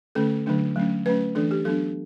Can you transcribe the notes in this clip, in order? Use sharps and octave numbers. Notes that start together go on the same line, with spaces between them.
D3 A3 C#4 A4
D3 F#3 A3 D4
F#3 A3 C#4
F#3 A3 C#4 B4
E3 A3 D4 A4
G4
F#3 B3 D4 A4